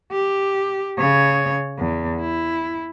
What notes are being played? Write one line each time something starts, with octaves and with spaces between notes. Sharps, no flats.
G4
C#3 C#5
E2
E4